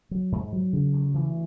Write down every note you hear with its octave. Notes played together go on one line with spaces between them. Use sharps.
F#3
G#2
F#3
C#3
D2
E3